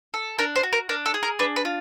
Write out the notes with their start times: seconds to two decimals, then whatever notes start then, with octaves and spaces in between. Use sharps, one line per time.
0.14 A4
0.39 D4 A#4
0.56 C5
0.63 F#4
0.73 A#4
0.89 D4 A#4
1.06 A4
1.14 G#4
1.23 A#4
1.39 D4 B4
1.56 B4
1.65 F4